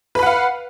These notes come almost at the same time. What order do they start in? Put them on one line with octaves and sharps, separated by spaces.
B4 B5 F#5 F5